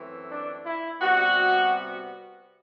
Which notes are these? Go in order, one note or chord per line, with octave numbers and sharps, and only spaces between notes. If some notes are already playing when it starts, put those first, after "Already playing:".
Already playing: F#2 E3 A3 C4
D4
E4
C3 G3 B3 F#4